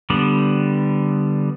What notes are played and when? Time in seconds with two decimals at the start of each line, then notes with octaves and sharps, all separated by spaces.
0.10 D3 G3 B3